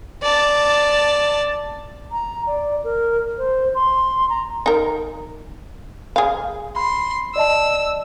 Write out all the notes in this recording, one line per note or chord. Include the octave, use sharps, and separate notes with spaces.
D5 A5
A#5
D5
A#4
C5
C6
A#5
D#4 A#4
G#4 F5
B5 C6
D5 D#5 A5 E6